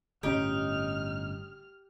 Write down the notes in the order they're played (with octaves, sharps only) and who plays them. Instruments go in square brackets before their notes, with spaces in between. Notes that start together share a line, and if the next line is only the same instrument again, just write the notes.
[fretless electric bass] G1 A2 C#4 [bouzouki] D#4 [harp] G4 [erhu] F6